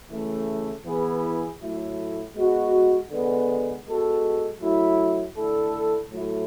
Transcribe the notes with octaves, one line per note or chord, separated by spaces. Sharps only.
C#3 E3 A3
E3 B3 E4 G#4
A2 F#3 A3 E4
G#3 B3 F#4
D3 G#3 B3
G#3 B3 F#4 A4
F#3 A3 E4
D3 A3 E4 A4
A2 F#3 A3 E4